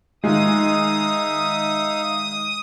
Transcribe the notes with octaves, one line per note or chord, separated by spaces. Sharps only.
D#3 G#3 D#4 E5 F5 D#6